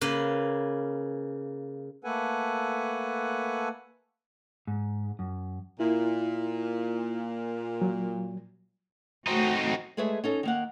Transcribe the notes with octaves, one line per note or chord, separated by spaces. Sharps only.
C#3 A#3 B4
A3 A#3 A4 B4 F#5 G#5
G#2
F#2
A#2 E4
F#3
F#3 A3 C4 D#4 F#4
G#3 A3 G#4 B4 C#5 E5
C#4 D#4 A4
D#3 A#3 F#5